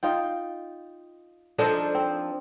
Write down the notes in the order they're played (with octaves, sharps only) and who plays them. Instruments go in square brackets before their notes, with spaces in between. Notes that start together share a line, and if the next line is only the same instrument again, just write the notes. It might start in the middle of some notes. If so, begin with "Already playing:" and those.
[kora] D#4 F4 G5
[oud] F3 D#4 A4 [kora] D4 A#4 C5
[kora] C4